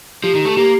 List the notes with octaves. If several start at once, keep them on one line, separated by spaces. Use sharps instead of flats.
F3 G4
D#3
A3 G4
A#3 G4